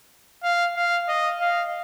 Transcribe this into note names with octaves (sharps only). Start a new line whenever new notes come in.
F5
F5
D#5
F5